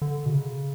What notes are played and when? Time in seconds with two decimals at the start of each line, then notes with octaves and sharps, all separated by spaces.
0.02 D3
0.26 B2
0.30 C#3